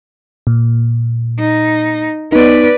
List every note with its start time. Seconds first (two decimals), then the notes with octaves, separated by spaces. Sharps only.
0.47 A#2
1.39 D#4
2.32 B3 D#4 B4 D5